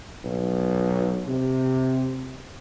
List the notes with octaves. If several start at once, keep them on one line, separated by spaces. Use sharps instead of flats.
B1
C3